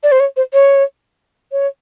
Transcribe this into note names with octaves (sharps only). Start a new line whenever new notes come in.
D5
C5
C#5
C5
C#5
C#5